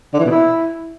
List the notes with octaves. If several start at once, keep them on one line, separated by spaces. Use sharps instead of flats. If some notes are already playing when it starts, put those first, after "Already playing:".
D3
E3
B2
E4